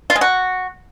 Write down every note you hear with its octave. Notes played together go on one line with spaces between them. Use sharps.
F4
G#3
F#4